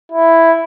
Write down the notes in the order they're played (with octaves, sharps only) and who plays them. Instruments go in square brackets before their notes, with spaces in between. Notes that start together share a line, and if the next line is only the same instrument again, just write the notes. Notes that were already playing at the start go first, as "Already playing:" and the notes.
[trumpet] E4